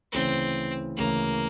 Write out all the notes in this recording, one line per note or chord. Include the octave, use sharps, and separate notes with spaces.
D2 C#3 E3 C4
D2 C#3 E3 A#3